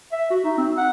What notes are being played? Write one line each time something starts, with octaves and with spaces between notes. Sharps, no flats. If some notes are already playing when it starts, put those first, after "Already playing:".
E5
F#4
D#4
C4
F#5